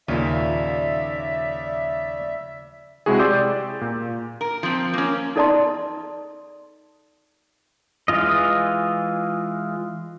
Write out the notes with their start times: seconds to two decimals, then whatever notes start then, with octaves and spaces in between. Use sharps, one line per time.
0.08 D#2 A#2 C#3 F3 D5 E5
3.06 C3 G#3 E4 F#4 G#4
3.19 G4 D5 C6 D6 E6 G6
3.81 A#2
4.41 A#4
4.63 F3 C4
4.94 A#3 C#4
5.36 D#4 A4 D5 D#5 A5 C6
8.08 E3 G#3 F4 D#5